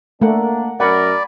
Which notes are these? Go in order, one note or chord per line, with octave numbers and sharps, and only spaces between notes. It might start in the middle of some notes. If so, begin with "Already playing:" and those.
A3 A#3 D4 A#4 F#5
F#2 A#4 D5 F#5 G#5 B5